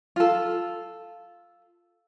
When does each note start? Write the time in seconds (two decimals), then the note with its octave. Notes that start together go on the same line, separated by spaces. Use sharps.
0.16 F4 A4